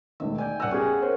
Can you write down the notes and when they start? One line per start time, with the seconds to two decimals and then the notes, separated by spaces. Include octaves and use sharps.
0.20 E1 D2 D#3 E5
0.38 D5 G5 G#5
0.60 D#1 D5 F#5 A#5 E6
0.71 B3 C#4 G4 G#4
1.02 A#4 C5 C#5